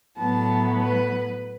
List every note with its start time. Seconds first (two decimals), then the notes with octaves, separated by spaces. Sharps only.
0.18 A2 F#3 B3 A5
0.81 B4